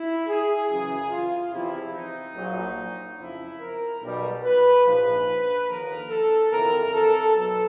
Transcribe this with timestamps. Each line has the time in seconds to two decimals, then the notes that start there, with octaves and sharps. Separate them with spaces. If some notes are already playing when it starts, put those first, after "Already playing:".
Already playing: E4
0.27 G#4
0.68 F#2 C#3 E3 G#4
1.10 F4
1.51 E2 C3 F3 E4
1.93 D#4
2.35 A#1 A#2 F#3
3.18 F2 C#3 F3 E4
3.59 A#4
4.02 B1 B2 G3
4.43 B4
4.84 A#1 G#2 F3 B4
5.67 D#2 D3 F3 A#4
6.10 A4
6.51 G1 F2 C3 E3 A#4
6.93 A4
7.34 B1 B2 F#3 A4